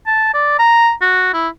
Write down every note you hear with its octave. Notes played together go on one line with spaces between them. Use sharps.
A5
D5
A#5
F#4
E4